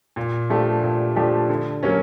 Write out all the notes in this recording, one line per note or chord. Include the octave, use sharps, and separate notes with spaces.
A#2
F3 A3 D4 G4
A#2
F3 A3 D4 G4
D3
F#3 A#3 C#4